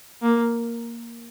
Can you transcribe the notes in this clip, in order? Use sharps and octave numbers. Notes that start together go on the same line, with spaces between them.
A#3